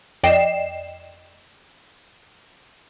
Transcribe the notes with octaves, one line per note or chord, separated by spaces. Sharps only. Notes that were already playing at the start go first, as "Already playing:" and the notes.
F2 D5 D#5 G5 C7 E7